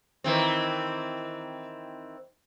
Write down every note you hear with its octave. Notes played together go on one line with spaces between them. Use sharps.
D#3 E3 C4